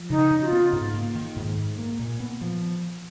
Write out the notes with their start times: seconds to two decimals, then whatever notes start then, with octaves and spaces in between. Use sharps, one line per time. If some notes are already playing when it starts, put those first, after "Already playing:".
Already playing: F3
0.10 C#3 D#4
0.31 C#3
0.41 F#4
0.45 F4
0.52 B3
0.73 G#2
0.94 A#3
1.15 D#3
1.36 G#2
1.58 G#2
1.78 A#3
1.99 A#2
2.20 B3
2.41 F3